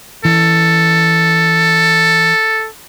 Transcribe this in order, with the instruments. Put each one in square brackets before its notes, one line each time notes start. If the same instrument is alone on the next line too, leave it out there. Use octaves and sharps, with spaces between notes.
[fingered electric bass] E3 [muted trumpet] A4